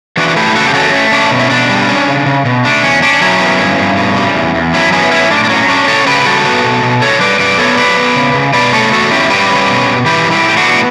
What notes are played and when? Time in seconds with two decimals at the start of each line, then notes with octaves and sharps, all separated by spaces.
0.17 E3 D4 F#4
0.36 A3 E4 G4
0.55 C#3 F#4 A4
0.68 G4
0.74 C#4 F#4 A4
0.93 A3
1.12 C#4 D4
1.31 B2
1.40 E4
1.50 B2 D4
1.69 G3
1.89 C#4
2.08 C#3
2.26 C#3
2.45 B2
2.65 A3 D4
2.83 E2 C#4
3.02 C#4 D4
3.21 F#3 C#4 E4
3.41 B3
3.59 G2
3.79 G2
3.97 B2
4.16 G3
4.35 E2
4.55 E2
4.74 F#3 C#4 E4
4.93 B3 C#4 E4
5.11 A2 C#4 E4
5.31 A2 D4
5.44 D4
5.50 F#3 C#4
5.69 C#4 D4
5.88 C#3 A4 C#5
6.06 C#3 G4 B4
6.25 G3 F#4 A4
6.45 B3
6.64 B2
6.83 B2
7.02 D3 A4 C#5
7.20 G3 B4 D5
7.39 F#2 B4 D5
7.58 B3 A4 C#5
7.77 F#3 B4 D5
7.97 B3
8.16 C#3
8.35 C#3
8.54 B2 B4 D5
8.72 A3 A4 C#5
8.92 E2 F#4 A4
9.11 C#4 E4 G4
9.30 G3 G4 B4
9.49 C#4
9.68 B2
9.87 B2
10.06 E3 G4 B4
10.25 G3
10.31 E4 G4
10.44 A2 G4
10.57 D4 F#4
10.63 B3